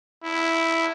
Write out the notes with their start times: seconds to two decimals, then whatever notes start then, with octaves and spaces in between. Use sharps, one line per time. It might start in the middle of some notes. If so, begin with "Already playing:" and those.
0.24 E4